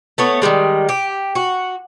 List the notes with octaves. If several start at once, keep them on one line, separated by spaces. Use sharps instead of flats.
A3 B3 C#5
D#3 E3 G3 G#3
G4
F#4